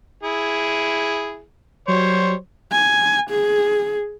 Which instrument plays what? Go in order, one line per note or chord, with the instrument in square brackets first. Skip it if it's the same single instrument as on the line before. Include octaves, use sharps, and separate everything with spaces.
[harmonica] E4 G#4
[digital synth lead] F#3 [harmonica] G3 C5 C#5
[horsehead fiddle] G#5
G#4